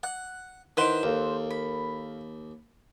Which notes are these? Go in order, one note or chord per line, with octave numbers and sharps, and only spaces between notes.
F#5 F#6
D#3 E4 B4 C5 D#5 F#5 D7
D#2 A4 A#4 F5
B5